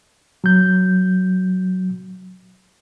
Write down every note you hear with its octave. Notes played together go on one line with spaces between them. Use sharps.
F#3 G6